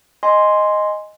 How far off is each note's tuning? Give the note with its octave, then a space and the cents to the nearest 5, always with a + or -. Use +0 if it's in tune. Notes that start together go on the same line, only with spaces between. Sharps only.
D#5 +0 G#5 +0 C6 +0